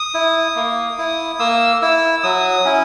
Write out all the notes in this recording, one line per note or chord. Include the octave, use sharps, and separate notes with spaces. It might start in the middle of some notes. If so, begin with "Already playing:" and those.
Already playing: D#6
E4
A#3
E4
A#3 E6
E4 E6
F#3 D#6
C#4 E4